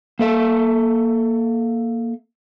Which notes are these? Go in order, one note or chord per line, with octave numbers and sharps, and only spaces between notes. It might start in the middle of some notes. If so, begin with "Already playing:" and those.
A#3 A4 E5